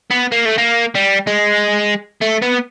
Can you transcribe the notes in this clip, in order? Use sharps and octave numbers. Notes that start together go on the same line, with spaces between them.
B3
A#3
A3
A#3
G3
G#3
A3
B3